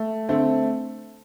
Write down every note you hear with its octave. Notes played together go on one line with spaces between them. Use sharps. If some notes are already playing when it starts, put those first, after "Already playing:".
Already playing: A3
D3 A3 C4